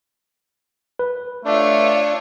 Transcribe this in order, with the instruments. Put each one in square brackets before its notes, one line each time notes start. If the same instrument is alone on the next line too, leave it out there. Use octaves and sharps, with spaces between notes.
[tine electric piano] B4
[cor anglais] A3 [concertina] D4 [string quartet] F4 C#5